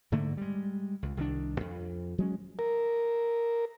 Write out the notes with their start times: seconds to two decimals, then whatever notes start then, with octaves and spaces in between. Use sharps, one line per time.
0.12 G#2 D3 A3 A#3
0.37 G3 G#3
1.03 C#2
1.17 C2 D#3 G3 D4
1.60 F2
2.18 F#3 G#3 C#4
2.59 A#4